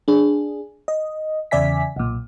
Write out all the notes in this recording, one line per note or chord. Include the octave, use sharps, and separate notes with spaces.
D4 G#4
D#5
E2 C#3 D5 E5 G#5 B6
B1 A#2